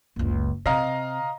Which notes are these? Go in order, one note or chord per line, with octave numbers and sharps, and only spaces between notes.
F#1 C#2
C3 D#5 F5 A#5